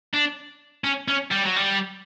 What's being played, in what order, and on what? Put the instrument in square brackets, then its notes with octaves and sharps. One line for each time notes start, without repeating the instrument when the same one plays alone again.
[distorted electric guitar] D4
C#4
C#4
G3
F#3
G3